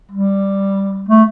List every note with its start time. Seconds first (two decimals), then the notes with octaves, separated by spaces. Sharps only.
0.11 G3
1.08 A3